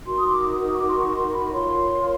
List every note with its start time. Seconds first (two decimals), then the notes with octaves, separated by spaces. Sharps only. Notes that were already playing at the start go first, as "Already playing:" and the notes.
0.04 D#4 F#4 A#4 C6
0.18 D#6
0.29 D6
0.53 D#6
0.74 C#6
0.78 D6
0.89 C6
0.96 C#6
1.15 C6
1.27 C6
1.34 B5
1.52 F4 A#4 C#5 C6